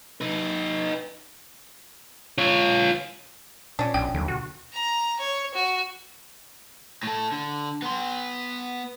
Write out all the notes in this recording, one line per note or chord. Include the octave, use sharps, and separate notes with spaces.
D#4 B4
F4 C#5
A#2 C#4 D4
B1 G5
D#2 D3 F#3
D#2 B2 D3 F#4
A#5
C#5
F#4
A2 A4
D3
B3 C6